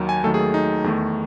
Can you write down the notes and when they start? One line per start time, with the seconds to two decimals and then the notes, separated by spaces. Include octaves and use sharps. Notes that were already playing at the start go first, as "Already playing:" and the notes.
Already playing: D#2 D#3 F#3
0.09 G#5
0.24 D#2 D#3 F#3 A3 A4
0.34 G#4
0.54 D#4
0.84 E2 D#3 A3